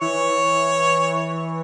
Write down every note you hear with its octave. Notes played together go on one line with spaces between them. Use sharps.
E3 C#5 C#6